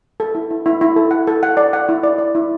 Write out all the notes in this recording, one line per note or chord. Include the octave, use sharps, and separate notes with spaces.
A4
E4
E4
E4
E4
A4
F#5
A4
F#5
D5
F#5
E4
D5
D5
E4